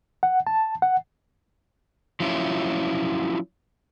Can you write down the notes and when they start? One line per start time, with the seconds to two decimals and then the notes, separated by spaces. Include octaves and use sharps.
0.23 F#5
0.47 A5
0.82 F#5
2.20 F3 F#3 C#4 E4 F4